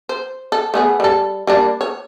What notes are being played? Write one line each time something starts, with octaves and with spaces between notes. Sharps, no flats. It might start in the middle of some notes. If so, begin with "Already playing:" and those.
C5
A4
A3 B3 G#4
G3 A4
G3 A#3 D4
C#5